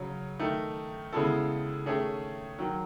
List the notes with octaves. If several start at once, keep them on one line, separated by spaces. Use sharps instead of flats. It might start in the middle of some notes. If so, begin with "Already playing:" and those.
Already playing: C#3 F#3 C#4
D#3 A3 D#4
C#3 G#3 B3 E4 A4
D#3 A3 C#4 G#4
D#3 F#3